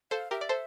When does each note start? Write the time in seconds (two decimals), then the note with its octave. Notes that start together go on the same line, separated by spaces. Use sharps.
0.11 A4 C5 F5
0.31 G4 A#4 E5
0.41 D5
0.49 A4 C5